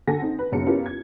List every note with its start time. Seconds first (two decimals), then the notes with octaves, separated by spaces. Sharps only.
0.07 D3 A4 F#5 G#5 A#6
0.22 C4 D#4
0.39 B4
0.52 B1 F#2 C#3 F#4 A5 C#7
0.66 B3 C#4 E4 F4 G4 A#4
0.86 G#6